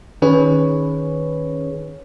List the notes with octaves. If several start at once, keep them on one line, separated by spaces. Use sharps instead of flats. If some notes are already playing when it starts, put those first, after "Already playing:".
D#3 C#4 G#4 B4 C#5